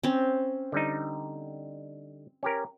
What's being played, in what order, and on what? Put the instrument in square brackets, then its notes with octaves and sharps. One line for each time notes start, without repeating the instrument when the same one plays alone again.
[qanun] C4 C#4
[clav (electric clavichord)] D3 G3 D#4
C#4 G4 A#4